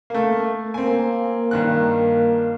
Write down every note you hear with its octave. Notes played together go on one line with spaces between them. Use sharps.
A3 A#3
A#3 C4 G#5
G2 D#3 F#6